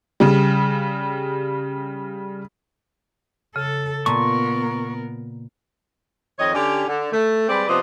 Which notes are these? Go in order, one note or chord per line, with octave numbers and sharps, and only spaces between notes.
C#3 G3
C#3 A4
A#2 B3 A#4 A5 C#6
F2 D#3 C#5 D#5
D3 C#4 D4 G4
D3
A3
G3 G#3 C4 B4 D5
C3 F3 B3 C5 D5 D#5